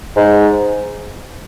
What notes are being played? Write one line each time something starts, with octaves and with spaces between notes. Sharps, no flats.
G#2